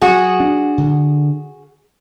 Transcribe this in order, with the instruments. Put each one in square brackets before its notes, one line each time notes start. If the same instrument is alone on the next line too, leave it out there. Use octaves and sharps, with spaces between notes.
[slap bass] F#3 [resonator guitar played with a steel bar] F#4 G#4
[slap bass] D4
D3